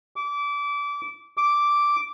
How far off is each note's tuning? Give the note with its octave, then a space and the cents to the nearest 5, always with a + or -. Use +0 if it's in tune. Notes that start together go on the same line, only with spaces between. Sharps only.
D6 -25
D6 -5